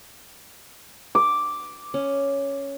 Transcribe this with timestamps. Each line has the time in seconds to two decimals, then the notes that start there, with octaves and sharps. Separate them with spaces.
1.15 D6
1.94 C#4